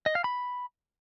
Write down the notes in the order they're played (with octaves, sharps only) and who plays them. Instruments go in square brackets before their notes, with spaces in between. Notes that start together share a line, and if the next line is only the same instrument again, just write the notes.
[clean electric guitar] D#5
F5
B5